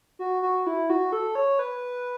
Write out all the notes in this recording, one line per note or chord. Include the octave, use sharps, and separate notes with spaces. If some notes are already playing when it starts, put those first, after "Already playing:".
F#4
F#4
E4
F#4
A4
C#5
B4